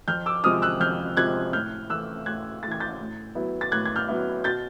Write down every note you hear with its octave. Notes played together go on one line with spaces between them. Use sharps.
F2 F6 G6
D6 E6
C3 F3 G#3 C4 D#6 F6
E6 F#6
F2 F6 G6
C3 F3 G#3 C4 F#6 G#6
A2 F6 G6
E3 A3 E6 F#6
A2 F#6 G#6
E3 A3 G#6 A6
G6 A6
A2
F#3 B3 E4
A6
A2 F#6 G#6
G#6
F6 G6
F#3 B3 E4
B2 G6 A6